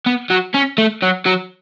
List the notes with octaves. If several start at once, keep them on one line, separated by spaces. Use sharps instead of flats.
B3
F#3
C#4
A3
F#3
F#3